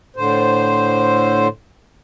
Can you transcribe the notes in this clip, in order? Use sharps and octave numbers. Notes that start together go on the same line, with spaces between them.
A2 D3 C5